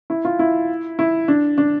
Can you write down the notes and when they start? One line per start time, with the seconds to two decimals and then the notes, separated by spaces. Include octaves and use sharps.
0.10 E4
0.25 F4
0.39 E4
0.99 E4
1.28 D4
1.58 D4